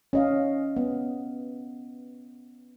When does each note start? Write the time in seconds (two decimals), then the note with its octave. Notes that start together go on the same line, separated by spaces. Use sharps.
0.13 C#4 D#5 F5
0.77 B3